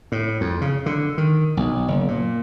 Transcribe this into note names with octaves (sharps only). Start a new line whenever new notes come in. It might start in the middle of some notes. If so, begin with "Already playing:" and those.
A2
F2
C#3
D3
D#3
B1
F#1
A#2